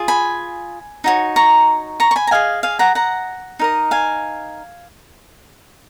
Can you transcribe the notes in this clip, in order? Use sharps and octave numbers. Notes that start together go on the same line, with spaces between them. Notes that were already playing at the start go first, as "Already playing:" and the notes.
Already playing: F4 G#4
G#5 B5
D#4 F#4 C#5
A#5 C#6
A#5 C#6
C#6
G#5 B5
A#5
G#4 D#5 F5 G#5
F5 G#5
F#5 A#5
F#5 A#5
D#4 A#4 D#5
F5 G#5